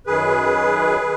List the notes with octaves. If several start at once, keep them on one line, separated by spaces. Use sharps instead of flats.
F#2 D#3 G#4 B4
D#3